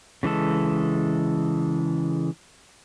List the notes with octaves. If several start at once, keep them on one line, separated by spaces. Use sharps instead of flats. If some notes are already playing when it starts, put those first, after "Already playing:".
C#3 E3 G#3 A4